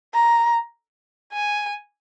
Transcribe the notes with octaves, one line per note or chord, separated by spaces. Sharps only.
A#5
G#5